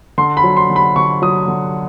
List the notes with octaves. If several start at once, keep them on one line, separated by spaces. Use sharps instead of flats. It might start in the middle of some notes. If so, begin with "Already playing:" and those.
D3 C6
B5
F#3
C6
D3
B5
D3 C#6
F#3 D#6
D3